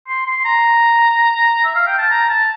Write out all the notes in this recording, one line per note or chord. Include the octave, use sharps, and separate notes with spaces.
C6
C6
A#5
E5
F5
G5
A5
A#5
A5